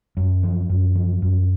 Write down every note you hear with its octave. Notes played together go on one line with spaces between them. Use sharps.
F#2
F3
F#2
F3
F#2